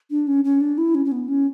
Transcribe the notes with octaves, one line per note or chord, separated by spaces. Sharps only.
D4
C#4
C#4
D4
E4
C#4
C#4
B3
C#4